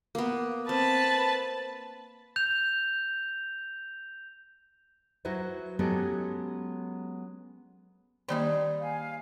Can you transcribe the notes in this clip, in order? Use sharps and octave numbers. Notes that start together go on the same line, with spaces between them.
A#3 B3
C4 B4 A5
G6 F7
F#3 E4 F#4 B4 C5
F#3 G#3 B3 C#4 G4 A4
D#3 G3 A#3 D#4 G#4
F5 G#5